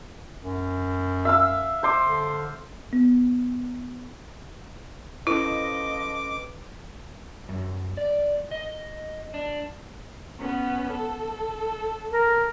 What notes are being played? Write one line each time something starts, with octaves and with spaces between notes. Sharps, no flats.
F#2
E5 F5 E6
C5 C6 D6
D3
B3
F3 C#4 E4 A4 B4 D#5 D6
F#2
D5
D#5
D4
B3 C#4
A4
A#4